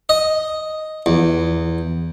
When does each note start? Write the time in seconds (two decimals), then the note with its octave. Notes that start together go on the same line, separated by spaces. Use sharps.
0.09 D#5
1.06 E2